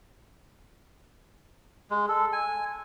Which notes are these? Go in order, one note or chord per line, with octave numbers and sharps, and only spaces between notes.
G#3
A4
G#5